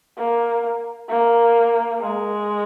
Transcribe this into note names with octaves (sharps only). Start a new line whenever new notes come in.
A#3
A#3
G#3